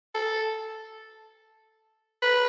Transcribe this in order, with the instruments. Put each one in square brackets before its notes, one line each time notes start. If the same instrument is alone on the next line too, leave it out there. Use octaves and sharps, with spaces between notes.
[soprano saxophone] A4
B4